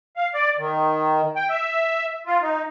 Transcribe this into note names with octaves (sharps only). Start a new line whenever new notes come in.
F5
D5
D#3
G5
E5
F4
D#4